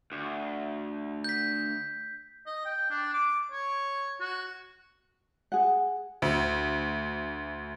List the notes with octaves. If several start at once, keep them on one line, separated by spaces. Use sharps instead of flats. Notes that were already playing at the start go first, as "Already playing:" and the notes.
D2
G6 B6
D#5
G5
D4
D6
C#5
F#4
G#4 F#5
D2